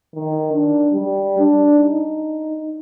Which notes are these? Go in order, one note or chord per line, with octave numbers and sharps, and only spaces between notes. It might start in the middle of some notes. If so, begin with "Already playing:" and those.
D#3
D4
G3
D4
D#4